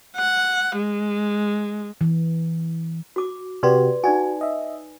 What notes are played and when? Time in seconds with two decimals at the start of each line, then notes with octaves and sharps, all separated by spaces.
0.17 F#5
0.77 G#3
2.01 E3
3.16 F#4 D6
3.63 C3 F#4 G4 B4 D5 C6
4.04 D#4 F#4 D5 G#5
4.41 D#5 E5